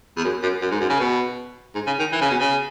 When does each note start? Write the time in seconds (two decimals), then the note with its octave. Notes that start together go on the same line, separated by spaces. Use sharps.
0.17 E2
0.24 F#2
0.43 F#2
0.62 F#2
0.71 G#2
0.81 F#2
0.90 C#3
1.00 B2
1.75 G#2
1.87 C#3
1.99 D#3
2.12 E3
2.22 C#3
2.31 B2
2.40 C#3